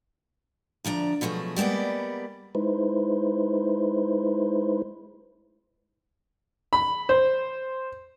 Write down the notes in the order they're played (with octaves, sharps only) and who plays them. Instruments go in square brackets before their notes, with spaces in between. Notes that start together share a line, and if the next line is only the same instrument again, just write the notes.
[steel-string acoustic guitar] D2 F3 D4 A#5
B2 F3 F#3 A3 G#4
G3 G#3 A#3 B3 D5
[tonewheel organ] G#3 D#4 E4 B4 C5
[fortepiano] B5
C5